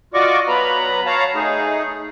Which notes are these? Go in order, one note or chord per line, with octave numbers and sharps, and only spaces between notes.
F4 F#4 D5 D#5 C#6 D6
F#3 B3 B4 A#5 B5
C#5 F5 A5 A#5
A3 D#4 G#4